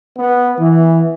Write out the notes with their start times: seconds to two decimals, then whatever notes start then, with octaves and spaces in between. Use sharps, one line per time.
0.18 B3
0.58 E3